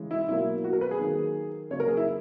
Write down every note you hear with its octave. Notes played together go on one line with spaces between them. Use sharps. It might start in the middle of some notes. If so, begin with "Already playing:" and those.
Already playing: C#3 E3 G#3
E4
B2 F#3 A#3 E4
F#4
A#4
B4
G#4
D#3 F#3 A#3
C#3 F#3 A#3 C#5
A#4
G#4
E4